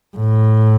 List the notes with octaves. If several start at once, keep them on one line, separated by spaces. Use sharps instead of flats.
A2